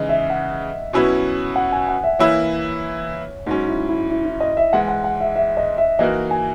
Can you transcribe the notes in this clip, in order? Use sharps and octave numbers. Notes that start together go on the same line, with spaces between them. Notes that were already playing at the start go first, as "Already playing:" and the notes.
Already playing: C#3 E3 G#3 D#4 D#5
E5
F#5
B2 F#3 C#4 E4 B4
F#5
G#5
F#5
E5
E3 A#3 E4 B4 C#5 E5
G#2 F#3 C#4 D#4
E4
E4
E4
E4
D#5
E5
G#2 E3 G#3 F#5
F#5
F#5
E5
E5
D#5
E5
E3 A#3 D#4 F#4 A#4 D#5
G#5